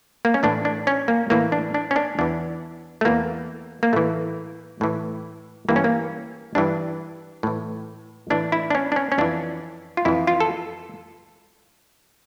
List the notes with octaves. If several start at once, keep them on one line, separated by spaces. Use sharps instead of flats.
A#3
C#4
A2 E3 D4
D4
C#4
A#3
A2 E3 A#3
D4
D4
C#4
D4
E2 E3 D4
A3
E2 E3 A#3
A#3
A2 E3 A3
A2 E3
G2 E3 A#3
C#4
A#3
G2 E3 D4
A2 E3
A2 E3 D4
E4
D4
C#4
D4
C#4
C#4
F2 E3 D4
F4
F2 E3 E4
F4
A4